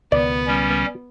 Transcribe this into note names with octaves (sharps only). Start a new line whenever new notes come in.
C#2 B2 D#3 B3 D5
G3 C#4